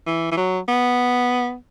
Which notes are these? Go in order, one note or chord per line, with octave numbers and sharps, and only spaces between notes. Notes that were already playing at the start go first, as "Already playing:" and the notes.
E3
E3
F#3
B3